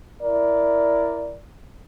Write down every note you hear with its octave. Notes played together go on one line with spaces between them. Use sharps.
E4 A#4 D5